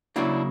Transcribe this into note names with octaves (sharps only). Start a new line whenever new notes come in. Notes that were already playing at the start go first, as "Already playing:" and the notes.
C#3 F#3 A#3 D4 E4